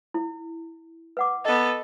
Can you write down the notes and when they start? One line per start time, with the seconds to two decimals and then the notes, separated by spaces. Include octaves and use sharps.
0.14 E4
1.17 B4 F#5 D6
1.45 B3 A4 D#5